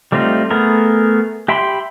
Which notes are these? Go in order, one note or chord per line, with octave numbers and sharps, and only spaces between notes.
G3 A3 C4 D#4 F4
A3 B3 G#4 A#4
G4 E5 G5 B5 C6